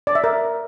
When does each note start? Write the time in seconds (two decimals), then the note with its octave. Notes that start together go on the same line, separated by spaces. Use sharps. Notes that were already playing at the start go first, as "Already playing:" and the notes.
0.07 D5
0.15 E5
0.24 A#4